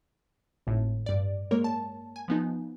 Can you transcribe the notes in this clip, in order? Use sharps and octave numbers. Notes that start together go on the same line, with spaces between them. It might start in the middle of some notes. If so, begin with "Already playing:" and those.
G#1 A2
G2 D5
G#3 A#3 A#4 C#5
A5
G#5
F3 B3 D#4